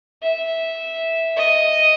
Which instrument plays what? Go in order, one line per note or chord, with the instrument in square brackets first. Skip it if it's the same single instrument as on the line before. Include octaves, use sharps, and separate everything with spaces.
[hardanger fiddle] E5
D#5